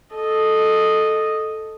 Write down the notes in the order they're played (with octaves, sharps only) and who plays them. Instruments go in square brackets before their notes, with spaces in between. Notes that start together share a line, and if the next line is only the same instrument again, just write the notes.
[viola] A4 D#5